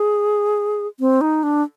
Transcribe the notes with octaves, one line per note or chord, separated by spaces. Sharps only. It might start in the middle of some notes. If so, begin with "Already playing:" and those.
Already playing: G#4
C4
D#4
D4